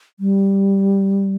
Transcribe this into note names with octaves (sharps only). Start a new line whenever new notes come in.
G3